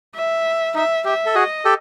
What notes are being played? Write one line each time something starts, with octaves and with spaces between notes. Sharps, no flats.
E5
D#4 E5
G4 E5
A4
F#4 G#4 D#5
G4 A4